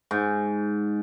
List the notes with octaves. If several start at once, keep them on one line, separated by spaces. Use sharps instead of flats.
G#2